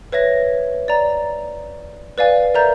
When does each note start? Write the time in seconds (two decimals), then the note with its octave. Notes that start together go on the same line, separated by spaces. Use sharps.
0.12 B4 C#5 E5 A#6
0.88 D5 A#5
2.18 B4 D5 F5 G#5
2.54 A#4 D5 E5 A#5 G6